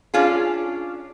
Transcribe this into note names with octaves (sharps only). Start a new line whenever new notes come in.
C#4 D4 F4 G#4